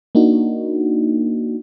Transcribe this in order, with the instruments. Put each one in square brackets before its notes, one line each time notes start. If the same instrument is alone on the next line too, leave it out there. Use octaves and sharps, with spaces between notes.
[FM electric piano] A#3 D4 D#4 F#4